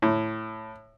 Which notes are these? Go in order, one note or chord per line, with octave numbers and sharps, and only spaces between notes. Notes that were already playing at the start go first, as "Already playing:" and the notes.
A2